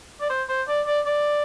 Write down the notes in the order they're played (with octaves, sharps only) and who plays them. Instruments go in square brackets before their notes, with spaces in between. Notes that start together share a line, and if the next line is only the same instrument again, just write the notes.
[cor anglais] D5
C5
C5
D5
D5
D5